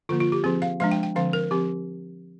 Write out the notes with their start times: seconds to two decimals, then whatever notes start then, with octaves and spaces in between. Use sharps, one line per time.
0.09 D3 F3 A#3 F4
0.20 F4
0.32 G4
0.44 F3 C4 G#4
0.62 F5
0.80 F3 G#3 D4 F5
0.91 G5
1.03 G5
1.15 D3 F3 C4 F5
1.33 A#4
1.51 F3 C4 G4